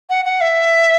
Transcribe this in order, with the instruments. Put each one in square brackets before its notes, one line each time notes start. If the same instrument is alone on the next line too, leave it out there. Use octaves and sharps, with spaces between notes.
[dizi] F#5
F#5
E5